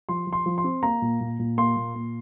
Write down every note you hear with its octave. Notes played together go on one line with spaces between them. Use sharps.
F3 C6
F3
C6
F3
C6
C4
A#3 A#5
A#2
A#2
A#2
A#3 C6
A#2
A#3